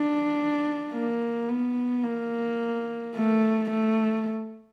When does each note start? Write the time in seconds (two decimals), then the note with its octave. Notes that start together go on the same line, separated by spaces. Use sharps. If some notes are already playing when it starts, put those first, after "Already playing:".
Already playing: D4
0.93 A#3
1.49 B3
2.04 A#3
3.15 A3
3.71 A3